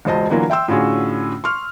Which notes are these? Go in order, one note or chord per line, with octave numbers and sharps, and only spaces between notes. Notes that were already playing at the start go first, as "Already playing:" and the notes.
E1 C#2 C5 D#5 A5
D3 E3 F#3 A#3 F4
E5 G5 C6 E6
A2 D3 C#4 F4 F#4 G#4
C6 C#6 F6